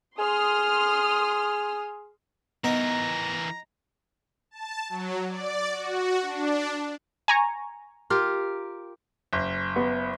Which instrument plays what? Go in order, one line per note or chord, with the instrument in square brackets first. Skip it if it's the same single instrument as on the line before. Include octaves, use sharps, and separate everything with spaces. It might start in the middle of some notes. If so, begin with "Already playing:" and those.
[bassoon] G#4 [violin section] C6 D#6 F6
[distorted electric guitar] E3 A#4 [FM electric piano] B3 [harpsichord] D#4 [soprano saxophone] A#5
[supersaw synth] A5
F#3
D5
F#4
D4
[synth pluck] G#5 A#5 C#6
[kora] F4 G4 A#4
[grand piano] F#1
[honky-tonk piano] B3